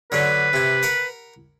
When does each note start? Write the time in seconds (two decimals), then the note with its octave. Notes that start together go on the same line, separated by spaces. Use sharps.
0.12 D3 F#3 D4 B4
0.53 C3 E4
0.83 A#4 F#5 B5